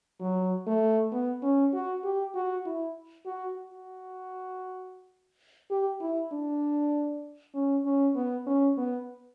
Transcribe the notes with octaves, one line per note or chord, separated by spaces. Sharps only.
F#3
A3
B3
C#4
F#4
G4
F#4
E4
F#4
F#4
G4
E4
D4
C#4
C#4
B3
C#4
B3